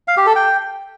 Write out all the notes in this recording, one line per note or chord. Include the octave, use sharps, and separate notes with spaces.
F5
G4
A4
G5